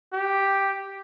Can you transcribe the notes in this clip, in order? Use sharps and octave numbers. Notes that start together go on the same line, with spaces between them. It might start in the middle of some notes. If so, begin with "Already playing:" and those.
G4